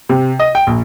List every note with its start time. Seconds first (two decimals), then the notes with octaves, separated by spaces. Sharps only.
0.09 C3
0.39 D#5
0.55 G5
0.67 A#1